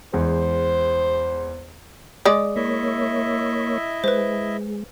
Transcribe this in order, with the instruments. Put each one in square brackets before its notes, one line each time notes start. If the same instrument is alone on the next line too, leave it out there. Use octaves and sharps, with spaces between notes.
[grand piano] E2 G#3 [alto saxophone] C5
[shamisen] G#3 D5 [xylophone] D6 D#6
[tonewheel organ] A#3 C#5 [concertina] E4 D#5 E5
[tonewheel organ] G#3 [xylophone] B4 C5